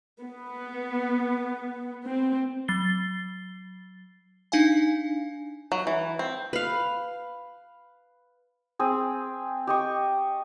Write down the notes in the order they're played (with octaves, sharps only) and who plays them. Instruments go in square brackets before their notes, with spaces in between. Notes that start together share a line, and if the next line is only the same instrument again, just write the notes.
[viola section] B3
C4
[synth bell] F#3 A6 C7 G7
D4 D#4 F5 G#5
[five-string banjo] F#3
E3
C4
[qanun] B4 F5
[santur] C4 G#4
G4 D#5 C#6